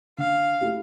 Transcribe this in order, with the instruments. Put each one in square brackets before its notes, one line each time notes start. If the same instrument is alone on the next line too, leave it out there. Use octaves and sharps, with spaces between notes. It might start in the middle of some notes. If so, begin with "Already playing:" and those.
[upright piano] D3 [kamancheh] F5
[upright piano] A3 E4 G4